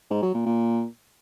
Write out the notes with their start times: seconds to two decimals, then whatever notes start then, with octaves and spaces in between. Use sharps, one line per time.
0.11 G#2
0.22 F#3
0.34 A#2
0.46 A#2